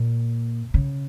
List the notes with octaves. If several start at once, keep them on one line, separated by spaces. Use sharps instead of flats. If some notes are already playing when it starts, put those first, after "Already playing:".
Already playing: A#2
C#3